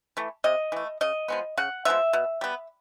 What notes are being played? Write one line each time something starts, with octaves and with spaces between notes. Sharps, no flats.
E3 A3
C3 D#5
E3 A3
C#3 D#5
F3 G#3 B3
C#3 F#5
F3 G#3 B3 E5
B2
G3 B3